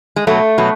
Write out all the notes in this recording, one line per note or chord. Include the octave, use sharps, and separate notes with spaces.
G#3
B2 F#3 A3
B2 F#3